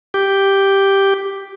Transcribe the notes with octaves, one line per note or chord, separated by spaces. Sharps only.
G4